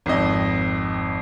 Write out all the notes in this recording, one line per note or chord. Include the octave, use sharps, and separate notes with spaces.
G#1 F2 D#5